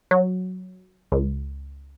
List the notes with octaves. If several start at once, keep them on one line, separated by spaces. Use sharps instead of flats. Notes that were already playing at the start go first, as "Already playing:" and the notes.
F#3
C#2